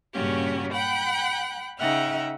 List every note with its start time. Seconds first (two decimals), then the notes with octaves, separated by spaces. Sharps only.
0.13 G2 A#2 C#3 C#4 F#4 G4
0.73 F#5 G5 B5 F#6
1.79 C#3 D#4 E5 F#5 G5 F6